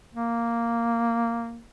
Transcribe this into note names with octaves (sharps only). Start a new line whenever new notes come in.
A#3